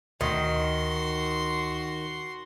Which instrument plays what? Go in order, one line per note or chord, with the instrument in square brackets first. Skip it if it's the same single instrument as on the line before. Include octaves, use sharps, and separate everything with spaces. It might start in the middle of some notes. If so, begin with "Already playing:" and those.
[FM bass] D2 [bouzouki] D#3 [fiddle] F#4 C6